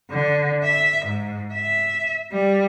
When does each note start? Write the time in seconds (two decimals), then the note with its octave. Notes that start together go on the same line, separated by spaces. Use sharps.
0.11 D3
0.64 E5
1.05 G#2
1.54 E5
2.32 G3